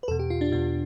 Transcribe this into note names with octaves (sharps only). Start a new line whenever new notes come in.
B4
E2 B2 A4
G4
F4
D4
E2 B2 D4